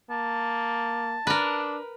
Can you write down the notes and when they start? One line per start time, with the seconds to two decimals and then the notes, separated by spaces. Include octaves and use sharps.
0.11 A#3 A5
1.27 D4 A#4 B4